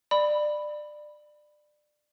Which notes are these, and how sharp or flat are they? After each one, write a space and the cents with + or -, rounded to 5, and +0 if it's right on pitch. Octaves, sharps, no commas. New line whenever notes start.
D5 +25 B5 +0